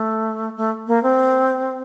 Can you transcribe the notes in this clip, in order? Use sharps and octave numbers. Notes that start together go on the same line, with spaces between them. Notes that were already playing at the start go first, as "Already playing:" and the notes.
Already playing: A3
A3
A#3
C4